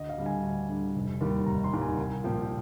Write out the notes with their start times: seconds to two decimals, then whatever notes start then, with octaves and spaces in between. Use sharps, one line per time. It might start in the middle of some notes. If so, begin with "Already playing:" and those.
Already playing: D2 D#5
0.09 F5
0.18 D3 G3
0.26 G#5
0.43 D2
0.69 D3 G3
0.96 F1
1.21 D#2 D#3 G3
1.47 F1 A#5
1.64 C6
1.73 D#2 D#3 G3
1.82 G#5
1.98 C2
2.24 A#2 F3 G5